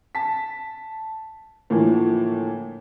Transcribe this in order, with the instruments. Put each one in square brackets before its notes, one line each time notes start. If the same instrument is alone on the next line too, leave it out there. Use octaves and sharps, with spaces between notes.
[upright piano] A5 B6
A2 D3 E3 F3 A#3